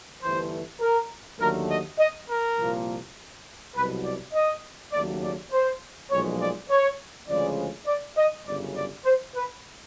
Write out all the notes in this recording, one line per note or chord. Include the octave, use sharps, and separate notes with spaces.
G1 G2 E3 A3 C5
A#4
D#2 D3 F#3 A3 A#4
D#5
D#5
A#4
C2 A#2 F3 A#3
C2 B2 F#3 B4
D5
D#5
D#2 C#3 F#3 A3 D5
D5
C5
B1 A#2 F3 G#3 C#5
D5
C#5
D2 C#3 F3 G#3 D5
D5
D#5
G1 F#2 C#3 D5
D5
C5
B4